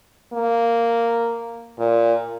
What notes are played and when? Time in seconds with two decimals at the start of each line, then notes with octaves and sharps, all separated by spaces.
0.33 A#3
1.79 A#2